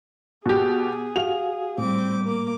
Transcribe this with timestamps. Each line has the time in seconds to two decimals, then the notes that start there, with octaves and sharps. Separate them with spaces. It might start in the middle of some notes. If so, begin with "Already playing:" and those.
0.46 B2 G4 G#4
1.16 F#4 G4 F5 F7
1.78 A2 G3 C4 D6
2.23 A#3 D6